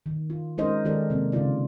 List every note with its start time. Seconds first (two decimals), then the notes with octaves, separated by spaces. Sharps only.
0.06 D#3
0.30 F4
0.58 G#3 C#4 D#4 A#4 C5 D#5
0.85 D#3 G#3 G4 A4 A#4 D5
1.10 C3 G#3 A#3 C4
1.32 C#3 G#3 D#4 F4 D5